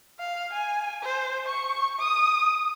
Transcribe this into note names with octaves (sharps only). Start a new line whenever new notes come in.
F5
G#5
C5
C#6
D#6